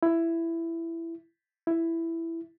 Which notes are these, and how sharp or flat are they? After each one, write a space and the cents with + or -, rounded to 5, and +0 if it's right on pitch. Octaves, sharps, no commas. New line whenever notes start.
E4 +10
E4 +5